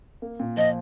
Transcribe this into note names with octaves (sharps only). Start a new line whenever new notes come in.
A#3
A#2
F3 D#5